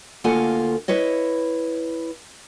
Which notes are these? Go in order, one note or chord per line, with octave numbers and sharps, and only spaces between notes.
D2 A#3 F4 A4 F#5 G#5
E4 B4 C#5 D#5